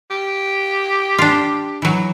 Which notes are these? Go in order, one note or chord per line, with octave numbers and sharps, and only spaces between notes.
G4
D4 F4
E3 F#3